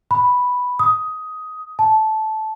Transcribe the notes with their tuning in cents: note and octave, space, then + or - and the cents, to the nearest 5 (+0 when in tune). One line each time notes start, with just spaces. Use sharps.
B5 +0
D#6 +10
A5 -15